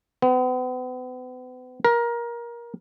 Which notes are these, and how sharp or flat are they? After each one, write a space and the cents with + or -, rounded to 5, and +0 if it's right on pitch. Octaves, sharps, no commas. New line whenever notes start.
B3 +40
A#4 +20